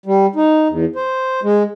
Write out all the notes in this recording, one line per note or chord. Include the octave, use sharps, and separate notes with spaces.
G3
D#4
E2
C5
G#3